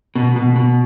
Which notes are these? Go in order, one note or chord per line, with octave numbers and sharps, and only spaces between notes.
B2
B2
B2